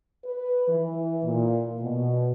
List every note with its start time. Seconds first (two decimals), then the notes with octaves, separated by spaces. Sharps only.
0.24 B4
0.68 E3
1.24 A#2
1.82 B2